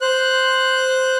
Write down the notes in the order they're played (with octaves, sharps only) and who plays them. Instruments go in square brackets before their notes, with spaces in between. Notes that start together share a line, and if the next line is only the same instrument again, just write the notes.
[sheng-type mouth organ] C5 F#6